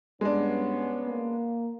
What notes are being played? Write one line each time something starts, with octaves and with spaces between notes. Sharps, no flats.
G2 G#3 B3 C#4 D4
A#3